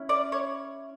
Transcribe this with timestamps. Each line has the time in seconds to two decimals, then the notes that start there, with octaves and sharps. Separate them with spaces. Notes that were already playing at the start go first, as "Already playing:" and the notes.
Already playing: C#4 E4
0.09 D5
0.32 C#5